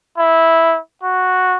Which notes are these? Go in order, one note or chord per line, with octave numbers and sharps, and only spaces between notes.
E4
F#4